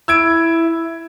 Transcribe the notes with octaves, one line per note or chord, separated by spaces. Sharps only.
E4 E6 G#6 D7